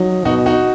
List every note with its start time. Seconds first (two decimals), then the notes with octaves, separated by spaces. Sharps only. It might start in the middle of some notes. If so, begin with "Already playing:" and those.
Already playing: F#3 D#4
0.25 B2 D#4 F#4
0.46 D#4 F#4